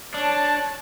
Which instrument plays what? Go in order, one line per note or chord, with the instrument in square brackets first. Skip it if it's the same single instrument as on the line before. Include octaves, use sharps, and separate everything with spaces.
[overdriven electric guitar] D4 [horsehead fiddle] C#5 A5